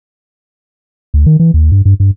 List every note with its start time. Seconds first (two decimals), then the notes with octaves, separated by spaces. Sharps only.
1.14 D2
1.26 D#3
1.40 E3
1.54 D#2
1.72 G2
1.85 G2
2.00 G2